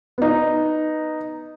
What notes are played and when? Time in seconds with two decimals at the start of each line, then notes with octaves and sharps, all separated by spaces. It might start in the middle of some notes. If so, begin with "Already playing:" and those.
0.18 B3 D#4